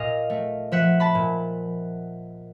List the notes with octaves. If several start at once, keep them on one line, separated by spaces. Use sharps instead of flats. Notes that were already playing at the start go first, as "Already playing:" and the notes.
Already playing: A#2 D#5 F5
A3
F3 E5 F#5
A5 B5
A#2